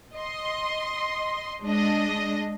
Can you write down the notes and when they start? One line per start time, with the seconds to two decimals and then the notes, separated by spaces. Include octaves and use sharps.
0.15 D#5 C6
1.63 G#3 D4 D#5